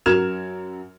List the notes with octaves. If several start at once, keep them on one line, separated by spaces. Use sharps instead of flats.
F#2 F#3 A#4 F6 G#6 E7